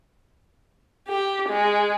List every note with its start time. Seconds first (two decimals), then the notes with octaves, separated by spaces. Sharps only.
1.08 G4
1.48 G#3